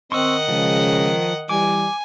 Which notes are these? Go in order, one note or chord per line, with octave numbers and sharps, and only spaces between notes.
D#3 C4 D#5 F#5 C6 C#6 E6
C#3 F3 G#3
E3 G3 G#5 D6